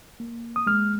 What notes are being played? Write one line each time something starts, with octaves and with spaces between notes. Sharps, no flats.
A#3
D#6
G#3 F6